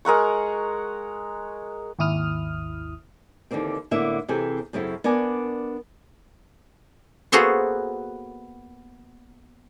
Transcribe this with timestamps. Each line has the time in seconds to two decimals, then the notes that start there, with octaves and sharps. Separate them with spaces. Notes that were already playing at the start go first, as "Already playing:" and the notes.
0.05 G#3 A#4 F#5 C#6
1.99 G#1 D#2 E4 D#6 F6
3.51 D#2 D3 E3 A#3 C4
3.91 A2 D3 A#3 B3 E4 E5
4.28 C3 E3 C4 G#4 A4 C5
4.73 F#2 C#3 C4 E4 A4
5.04 B3 D4 A#4 D5 G#5
7.32 A#3 B3 F#4 G#4 A4 C5